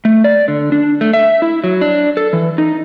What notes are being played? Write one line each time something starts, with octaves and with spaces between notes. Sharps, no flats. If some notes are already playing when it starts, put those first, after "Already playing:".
A3
D5
D3
D4
A3
E5
E4
F#3
D4
A4
E3
D#4